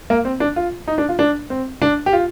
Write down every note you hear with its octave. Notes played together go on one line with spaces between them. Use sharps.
A#3
C4
D4
F4
D#4
D4
F4
D4
C4
D4
G4
F4